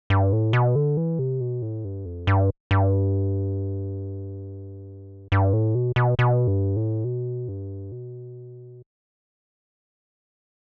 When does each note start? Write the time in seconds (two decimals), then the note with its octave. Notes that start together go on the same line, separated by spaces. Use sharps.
0.10 G2
0.33 A2
0.53 B2
0.76 D3
0.97 E3
1.19 C3
1.40 B2
1.62 A2
1.85 G2
2.06 F2
2.27 G2
2.71 G2
5.32 G2
5.53 A2
5.75 B2
5.96 B2
6.19 B2
6.47 G2
6.76 A2
7.04 B2
7.48 G2
7.92 B2